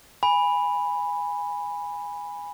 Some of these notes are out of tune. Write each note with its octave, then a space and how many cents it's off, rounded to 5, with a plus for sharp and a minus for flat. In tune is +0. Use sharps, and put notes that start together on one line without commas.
G#5 -15 B5 +0